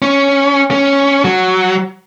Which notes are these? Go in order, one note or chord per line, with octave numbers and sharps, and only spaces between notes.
C#4
C#4
F#3